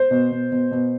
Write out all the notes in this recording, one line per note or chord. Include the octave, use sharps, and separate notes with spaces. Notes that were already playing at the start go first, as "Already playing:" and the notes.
Already playing: C5
B2
B2
B2
B2